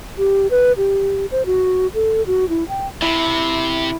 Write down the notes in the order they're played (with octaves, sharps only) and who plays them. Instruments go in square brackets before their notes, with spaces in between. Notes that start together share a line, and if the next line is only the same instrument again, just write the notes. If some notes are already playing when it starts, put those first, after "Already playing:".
[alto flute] G4
B4
G4
C5
F#4
A4
F#4
E4
G5
[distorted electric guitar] C3 [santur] E4